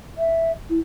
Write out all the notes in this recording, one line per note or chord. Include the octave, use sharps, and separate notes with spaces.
E5
E4